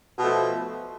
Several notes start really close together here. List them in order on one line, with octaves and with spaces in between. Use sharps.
B2 A3 F3